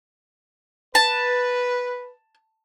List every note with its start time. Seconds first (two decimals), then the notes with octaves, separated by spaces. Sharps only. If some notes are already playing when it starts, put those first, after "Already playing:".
0.95 B4 A5